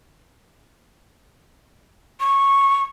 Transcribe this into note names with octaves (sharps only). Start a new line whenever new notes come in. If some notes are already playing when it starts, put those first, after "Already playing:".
C#6